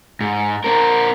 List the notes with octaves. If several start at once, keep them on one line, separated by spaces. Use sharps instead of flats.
G#2
C4 A#4